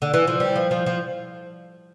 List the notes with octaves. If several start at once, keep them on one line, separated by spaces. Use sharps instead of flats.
D3
E3
F3
G3
F3
F3
F3